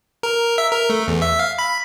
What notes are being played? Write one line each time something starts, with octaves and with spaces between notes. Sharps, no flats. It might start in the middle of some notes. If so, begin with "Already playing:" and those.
A#4
E5
A#4
A3
E2
E5
F5
B5